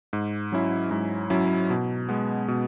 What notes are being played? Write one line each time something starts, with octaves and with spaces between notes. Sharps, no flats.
G#2
F#3 C#4 E4
G#2
F#3 C#4 E4
B2
G#3 B3
B2